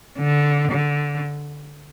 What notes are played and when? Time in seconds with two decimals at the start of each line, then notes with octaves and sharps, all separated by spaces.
0.19 D3
0.71 D3